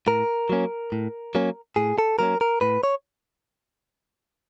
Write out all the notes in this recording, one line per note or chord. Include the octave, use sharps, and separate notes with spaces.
A2 A#4
F#3 A#3 C#4
A2
F#3 A#3 C#4
A2 G#4
A4
F#3 A#3 C#4 A#4
A#4
A2 B4
C#5